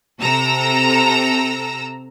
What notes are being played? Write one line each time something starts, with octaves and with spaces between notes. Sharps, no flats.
C3 A4 A#5 E6